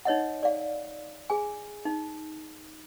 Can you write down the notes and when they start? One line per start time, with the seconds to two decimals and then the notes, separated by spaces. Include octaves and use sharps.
0.05 D#4 C#5 D#5 F#5
0.43 D5 F5
1.30 G#4 G#5
1.85 D#4